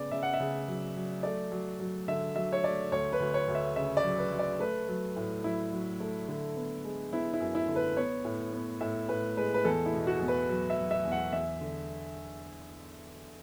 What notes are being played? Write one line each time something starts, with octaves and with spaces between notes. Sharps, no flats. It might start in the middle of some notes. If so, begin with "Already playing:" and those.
Already playing: C#3 B3 D5
C#3 E5
F#5
E5
C#3
F#3
F#3
A3 D5
F#3
F#3
D3 E5
F#3 E5
C#5
A3 D5
D2 C#5
B4
D2
C#5
D2
E5
C#3 E5
D5
F#3
B4
F#3
D5
A3 B4
F#3
A2
F#3 E4
F#3
A3
D3
B3
G#3
B3 E4
E4
F#2
E4
D3
B4
B3 C#5
A2
B3
A2 E5
A2 B4
G#3 B4
B4
E2 A4
E4
B2
F#4
E2
B4
F#3
E5
F#3
E5
E2
F#5
E2 E5
D3